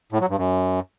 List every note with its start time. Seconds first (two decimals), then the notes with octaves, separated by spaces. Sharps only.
0.12 A2
0.21 F#3
0.29 G2
0.37 F#2